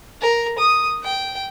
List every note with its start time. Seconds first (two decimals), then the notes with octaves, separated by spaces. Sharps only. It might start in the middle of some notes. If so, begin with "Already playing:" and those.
0.21 A#4
0.58 D#6
1.04 G5